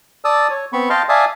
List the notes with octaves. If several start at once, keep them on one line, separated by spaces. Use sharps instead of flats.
D5 A5 D#6 E6
C#5
B3 C4 B5 C#6
D#5 F5 G5 A5 C6 F6
D5 E5 F5 G#5 A5 D#6